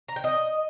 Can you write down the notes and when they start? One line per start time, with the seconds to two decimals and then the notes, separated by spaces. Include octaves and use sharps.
0.08 A#5
0.16 G5
0.24 D#5